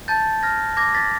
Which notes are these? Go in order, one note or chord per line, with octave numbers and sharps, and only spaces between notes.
A5 G6 A6
F6 G#6 A#6
D6 G#6 A#6
A6 B6